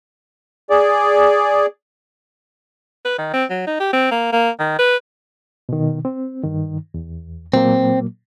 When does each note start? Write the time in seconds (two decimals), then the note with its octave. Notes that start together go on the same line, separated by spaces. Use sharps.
0.70 G#4 D5
3.05 B4
3.18 D#3
3.34 C4
3.50 F#3
3.67 D#4
3.80 G4
3.93 C4
4.11 A#3
4.33 A#3
4.59 D#3
4.79 B4
5.69 B2 D#3
6.05 C4
6.43 G2 D#3
6.94 E2
7.54 A#2 F#3 A#3 C4